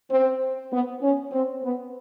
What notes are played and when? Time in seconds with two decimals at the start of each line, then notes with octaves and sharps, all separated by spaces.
0.10 C4
0.71 B3
1.02 C#4
1.31 C4
1.63 B3